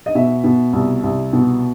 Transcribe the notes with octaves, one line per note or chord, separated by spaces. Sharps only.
D#5
B2 E5
B2
C2
C2
B2